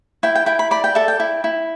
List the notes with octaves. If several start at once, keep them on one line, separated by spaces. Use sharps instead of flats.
E4 G5
G5
E4 G5
B5
D5 B5
G5
A4 E5
G5
E4
E4